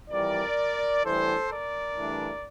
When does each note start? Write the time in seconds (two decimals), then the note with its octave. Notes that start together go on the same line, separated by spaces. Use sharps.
0.10 F2 E3 G3 A#4 D5
1.04 A2 E3 G3 D4 A4 C5
1.50 A#4 D5
1.96 G2 E3 A3 D4